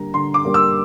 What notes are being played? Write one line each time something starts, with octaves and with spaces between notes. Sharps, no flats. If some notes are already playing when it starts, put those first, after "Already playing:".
Already playing: D3 G3 A#3 A#5
D3 C6
D6
G3 A#3
E6